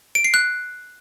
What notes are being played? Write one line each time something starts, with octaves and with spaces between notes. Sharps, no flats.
D7
C7
F#6